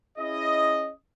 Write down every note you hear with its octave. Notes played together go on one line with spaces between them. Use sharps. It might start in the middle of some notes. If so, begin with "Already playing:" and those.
C#4 E4 G#4 D#5